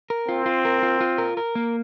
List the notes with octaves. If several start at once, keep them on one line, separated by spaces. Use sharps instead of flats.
A#4
C4 F4
F4
A#4
F4
F4
A#4
A#4
A#3